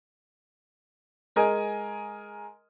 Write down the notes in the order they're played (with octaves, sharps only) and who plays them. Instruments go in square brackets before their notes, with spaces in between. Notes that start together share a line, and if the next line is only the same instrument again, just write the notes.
[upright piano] G#3 A#4 D#5 G#5